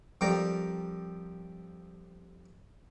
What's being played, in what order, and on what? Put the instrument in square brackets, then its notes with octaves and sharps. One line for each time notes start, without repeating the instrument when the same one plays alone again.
[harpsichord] F2 G3 A#4 D5 G5 A#5